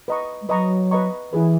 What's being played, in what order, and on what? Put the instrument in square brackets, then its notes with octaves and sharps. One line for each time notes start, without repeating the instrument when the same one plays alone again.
[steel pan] B4 D#5 A#5 C#6
[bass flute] G#3
[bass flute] F#3 [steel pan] B4 D#5 A#5 C#6
[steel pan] B4 D#5 A#5 C#6
[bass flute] E3 [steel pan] E4 G#4 B4